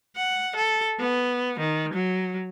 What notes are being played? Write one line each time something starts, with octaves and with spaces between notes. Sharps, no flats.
F#5
A4
B3
D#3
F#3